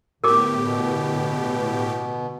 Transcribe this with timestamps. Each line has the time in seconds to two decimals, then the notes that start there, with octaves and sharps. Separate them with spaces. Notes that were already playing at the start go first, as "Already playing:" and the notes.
0.24 A2 D3 B3 G4 A#4 D6
0.65 B2